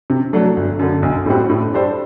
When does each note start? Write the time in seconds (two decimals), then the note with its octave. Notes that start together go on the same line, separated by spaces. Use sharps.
0.10 C3
0.33 F#3 A3 D4 A4
0.57 G1
0.79 F#2 D3
1.03 B1
1.26 A2 G3 C4 F#4
1.49 A2
1.73 G3 D4 A4 C5